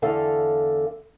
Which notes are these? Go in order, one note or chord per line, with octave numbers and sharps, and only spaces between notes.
E2 D3 A4 F5